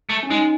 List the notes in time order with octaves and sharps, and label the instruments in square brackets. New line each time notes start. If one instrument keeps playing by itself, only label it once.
[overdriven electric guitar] A3
[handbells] C#4
[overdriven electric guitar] G#3 [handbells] D#4